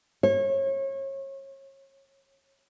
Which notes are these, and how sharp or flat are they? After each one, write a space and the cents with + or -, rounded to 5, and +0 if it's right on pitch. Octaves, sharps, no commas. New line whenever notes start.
C#5 -30